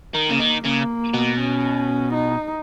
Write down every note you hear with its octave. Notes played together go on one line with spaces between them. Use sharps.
D#3
C#3 A#3
D#3
C#3 A#3
B2
C#4
D#4